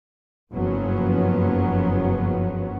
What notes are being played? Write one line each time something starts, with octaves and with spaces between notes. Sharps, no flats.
F#1 G2 F3 F#3 B3 C#4